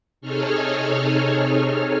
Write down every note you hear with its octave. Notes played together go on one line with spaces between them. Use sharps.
C3 D#4 G#4 A4 C#5 F6